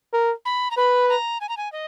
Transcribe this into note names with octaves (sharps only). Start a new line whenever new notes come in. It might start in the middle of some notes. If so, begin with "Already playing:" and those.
A#4
B5
A#5
B4 B5
A#5
G#5
A#5
G#5
D#5